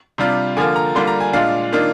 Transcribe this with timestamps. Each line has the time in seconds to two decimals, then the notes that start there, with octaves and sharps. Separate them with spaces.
0.18 C3 G3 D4 F4
0.57 D3 F3 A#3 F4 G#5
0.76 A#5
0.95 D3 G3 A#3 D4 F4 C6
1.07 A#5
1.20 G#5
1.33 A#2 G#3 D4 F4 F5
1.72 D#3 A#3 D4 F4